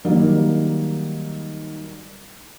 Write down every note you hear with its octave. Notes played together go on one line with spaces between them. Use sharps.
D#3 F#3 G3 A#3